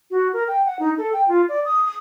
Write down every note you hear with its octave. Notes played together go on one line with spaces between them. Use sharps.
F#4
A#4
G5
F#5
D#4
A4
G5
F4
D5
D#6
D#6